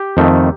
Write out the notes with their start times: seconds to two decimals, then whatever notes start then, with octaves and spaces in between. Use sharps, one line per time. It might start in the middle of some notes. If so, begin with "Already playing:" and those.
Already playing: G4
0.17 F2 D#3 A3